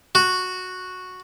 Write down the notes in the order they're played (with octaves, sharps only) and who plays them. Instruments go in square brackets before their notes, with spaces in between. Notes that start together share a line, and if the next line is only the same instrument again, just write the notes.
[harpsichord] F#4